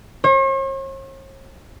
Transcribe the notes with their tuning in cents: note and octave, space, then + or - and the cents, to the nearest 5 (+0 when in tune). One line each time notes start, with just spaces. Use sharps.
C#5 -45